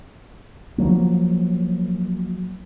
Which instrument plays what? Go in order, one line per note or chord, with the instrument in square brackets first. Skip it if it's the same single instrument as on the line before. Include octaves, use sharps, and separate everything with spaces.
[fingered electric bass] F3 F#3 A#3